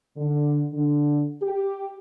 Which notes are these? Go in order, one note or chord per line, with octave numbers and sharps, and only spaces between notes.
D3
D3
G4